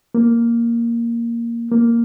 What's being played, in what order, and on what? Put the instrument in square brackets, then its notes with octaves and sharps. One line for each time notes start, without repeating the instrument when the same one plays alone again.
[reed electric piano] A#3
A#3